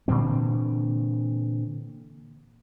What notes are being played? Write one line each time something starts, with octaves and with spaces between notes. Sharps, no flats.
A#2 D3 E3 C4